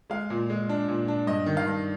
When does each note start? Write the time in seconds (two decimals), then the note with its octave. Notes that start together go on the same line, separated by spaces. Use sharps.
0.10 G#3 F5
0.30 A#2
0.50 G#3
0.69 D4
0.88 A#2
1.08 D4
1.27 G2 D#5
1.46 D#3
1.57 F5
1.66 G2